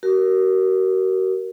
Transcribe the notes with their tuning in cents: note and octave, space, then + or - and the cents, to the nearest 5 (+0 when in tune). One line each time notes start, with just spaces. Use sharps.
F#4 +40 A#4 +0